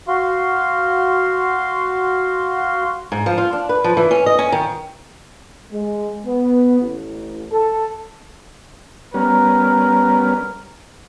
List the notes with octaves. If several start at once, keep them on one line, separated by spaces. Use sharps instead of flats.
F#4 F5 C6
G#2
F3
F4
D4
B4
F3
E3
C#4
D#5
C#4
D#3
G#3
B3
A1
A4
G3 B3 C#4 A#4